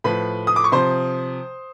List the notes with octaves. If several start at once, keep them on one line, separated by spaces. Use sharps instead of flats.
A2 F3 B4 B5
D#6
D6
C#6
C3 F3 C5 C6